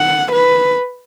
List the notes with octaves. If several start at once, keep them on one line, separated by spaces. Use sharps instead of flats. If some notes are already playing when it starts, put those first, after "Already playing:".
Already playing: F#5
B4